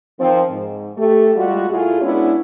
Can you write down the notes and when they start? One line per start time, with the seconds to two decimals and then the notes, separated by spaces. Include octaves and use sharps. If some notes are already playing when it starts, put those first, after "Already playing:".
0.20 D#3 F3 C4
0.51 G#2
0.97 A3 G4
1.36 G3 G#3 F4 F#4
1.70 A#2 A3 E4 F4 G#4
2.01 G#3 B3 C#4 D4 E4 F#4